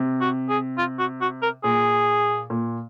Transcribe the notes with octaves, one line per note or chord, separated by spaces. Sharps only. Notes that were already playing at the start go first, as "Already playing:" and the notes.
Already playing: C3
F#4
G#4
F4
F#4
F#4
A#4
A#2 G#4
A#2